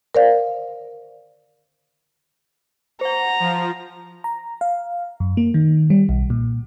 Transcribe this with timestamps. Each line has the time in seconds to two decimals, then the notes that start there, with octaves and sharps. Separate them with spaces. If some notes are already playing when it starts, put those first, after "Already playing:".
0.15 A#4 C5 D5 F5
3.01 C5 F#5 A#5
3.40 F3
4.24 A#5
4.61 F5
5.20 F#2
5.37 A#3
5.54 D#3
5.90 G3
6.09 B1
6.30 A#2